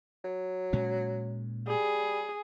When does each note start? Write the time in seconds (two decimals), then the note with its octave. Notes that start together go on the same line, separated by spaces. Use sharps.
0.24 F#3
0.73 A#2 G#3 C#4
1.68 G3 G#4